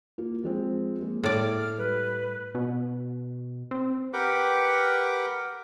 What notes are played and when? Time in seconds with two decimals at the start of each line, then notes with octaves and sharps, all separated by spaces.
0.18 A#3 F4
0.43 F3 G#3 C4
1.01 G#3 A#3
1.24 A2 D5 F6
1.57 F6
1.78 G3 B4
2.55 B2
3.71 C4
4.13 G4 A#4 B4 F#5 G5 D6